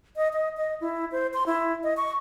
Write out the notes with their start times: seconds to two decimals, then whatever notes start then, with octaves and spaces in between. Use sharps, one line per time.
0.17 D#5
0.33 D#5
0.57 D#5
0.81 E4
1.12 C5
1.34 C6
1.46 E4
1.84 D#5
1.97 C#6